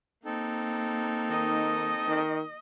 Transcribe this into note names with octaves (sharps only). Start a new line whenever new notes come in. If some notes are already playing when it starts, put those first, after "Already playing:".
A#3 C4 D#4 A4
D#3 D#5
D#3